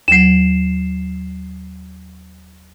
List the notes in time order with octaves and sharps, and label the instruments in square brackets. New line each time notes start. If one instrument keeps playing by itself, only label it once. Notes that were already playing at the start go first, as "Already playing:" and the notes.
[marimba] D#2 F#3 [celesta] C7 E7